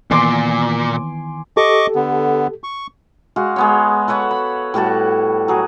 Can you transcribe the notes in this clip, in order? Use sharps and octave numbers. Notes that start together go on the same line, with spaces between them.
A#2 D#3 E3 B3 G#5 C6 D6
G4 A4 D#5 C#6 D6
D3 B3
C#6
G#3 F#4 F5
G#3 B3 C#5
A4 B4 C#5 F#5
B5
A2 G3 F#4 A5
F#3 G#4